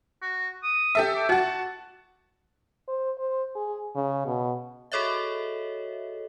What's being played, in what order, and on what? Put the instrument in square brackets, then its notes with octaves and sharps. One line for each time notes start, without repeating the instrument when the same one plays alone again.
[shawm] F#4
D#6
[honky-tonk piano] G4 A4 E5
[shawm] D6
[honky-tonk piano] F#4 F#5 [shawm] A5
[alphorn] C5
C5
G#4
C#3
B2
[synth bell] F#4 G#4 A4 C#5 D#5 E5